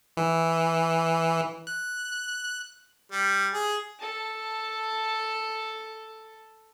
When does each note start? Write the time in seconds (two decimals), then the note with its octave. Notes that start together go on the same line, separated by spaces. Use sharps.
0.17 E3
1.67 F#6
3.12 G3
3.53 G#4
3.99 A4 A5